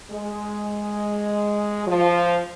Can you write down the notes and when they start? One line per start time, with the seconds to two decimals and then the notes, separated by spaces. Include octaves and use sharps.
0.11 G#3
1.86 F3